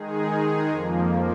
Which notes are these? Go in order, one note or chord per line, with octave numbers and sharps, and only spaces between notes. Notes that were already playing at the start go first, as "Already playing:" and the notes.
Already playing: D#3 G#3 D#4 G#4
F2 F3 A#3